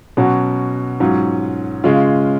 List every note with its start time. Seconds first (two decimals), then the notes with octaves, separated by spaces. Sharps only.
0.17 B2 F#3 C#4 F#4
1.00 G#2 F#3 C#4 F4
1.84 C#3 G#3 C#4 F4